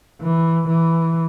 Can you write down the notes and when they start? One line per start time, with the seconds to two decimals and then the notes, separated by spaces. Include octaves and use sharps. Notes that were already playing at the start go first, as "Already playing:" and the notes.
0.21 E3
0.68 E3